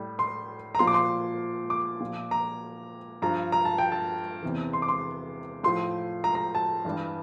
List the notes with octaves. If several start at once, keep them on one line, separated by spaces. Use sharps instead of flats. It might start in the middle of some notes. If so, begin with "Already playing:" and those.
Already playing: A2 G3
C6
A#5
A#2 F3 C6
D6
C6
D6
A#2 F3
A#5
G2 F3 A#5
A#5
A5
G5
A5
E2 C3 E3
C6
D6
C6
A2 F3 C6
A#5
A#5
A5
G2 E3 G3